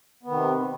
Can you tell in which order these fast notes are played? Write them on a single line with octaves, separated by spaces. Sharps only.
B3 D#3 C3